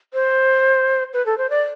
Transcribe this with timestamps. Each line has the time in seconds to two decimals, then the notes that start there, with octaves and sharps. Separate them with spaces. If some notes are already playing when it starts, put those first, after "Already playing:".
0.14 C5
1.13 B4
1.26 A4
1.38 C5
1.50 D5